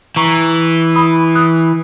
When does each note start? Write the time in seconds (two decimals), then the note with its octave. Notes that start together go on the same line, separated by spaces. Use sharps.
0.16 E3 A#5 C#6
0.95 B5 D#6
1.35 D#6 F#6